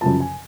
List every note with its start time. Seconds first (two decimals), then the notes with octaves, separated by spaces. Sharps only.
0.01 F#2 C#3 F3 A5
0.20 G#5